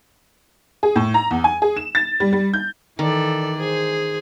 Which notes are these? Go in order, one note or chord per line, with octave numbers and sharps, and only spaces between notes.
G#4
A2
A#5
E2
G#5
G#4
E7
A6
G3
G3
G6
D#3 E3 A4 D5
G#4 C5